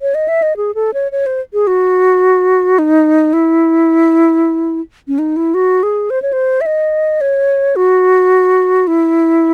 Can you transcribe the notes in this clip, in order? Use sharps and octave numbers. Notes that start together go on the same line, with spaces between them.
C#5
D#5
E5
D#5
G#4
A4
C#5
C#5
C5
G#4
F#4
D#4
E4
C#4
D#4
E4
F#4
G#4
C5
C#5
C5
E5
D#5
C#5
F#4
E4